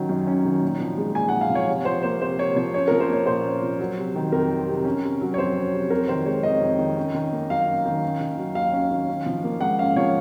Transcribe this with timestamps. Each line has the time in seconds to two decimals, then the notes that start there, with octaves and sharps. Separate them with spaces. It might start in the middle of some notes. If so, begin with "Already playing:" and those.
Already playing: D#3 F#3 C#4
0.09 F#2
0.27 C#4
0.45 D#3
0.62 A#2
0.80 F3
0.98 G#3
1.15 A#2 G#5
1.29 F#5
1.34 A#2
1.41 F5
1.50 F3
1.55 C#5
1.68 C3
1.85 F3 C5
2.03 A#3 C5
2.21 C3 C5
2.39 C3 C#5
2.56 F3 C#5
2.74 C#4 C#5
2.88 F3 A#4
3.00 C5
3.09 A#3 C#5
3.26 A#2 C5
3.44 C#4
3.62 F3
3.79 F#3
3.98 C3
4.15 D#3
4.32 F2 A#4
4.50 F#3
4.68 C3
4.85 C#4
5.03 C3
5.21 F#3
5.34 C#5
5.38 F2 C5
5.56 C#4
5.73 C3
5.90 F2 A#4
6.08 D#3 C5
6.26 G#3 C#5
6.43 F2 D#5
6.61 F2
6.79 D#3
6.97 C#4
7.14 D#3
7.33 A#3
7.50 F#2 F5
7.67 C#4
7.85 D#3
8.03 C#4
8.21 D#3
8.37 F#3
8.55 D#2 F5
8.72 C#4
8.91 D#3
9.09 C#4
9.26 F3
9.44 A#3
9.60 G#2 F#5
9.79 C#4 F5
9.96 F3 C#5